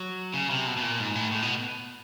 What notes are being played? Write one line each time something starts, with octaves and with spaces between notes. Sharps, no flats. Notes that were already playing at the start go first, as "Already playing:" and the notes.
Already playing: F#3
C#3
C3
B2
B2
A#2
G#2
A2
A2
B2